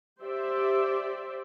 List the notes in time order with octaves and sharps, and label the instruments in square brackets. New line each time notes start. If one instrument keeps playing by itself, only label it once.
[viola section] G4 C5 D5 E5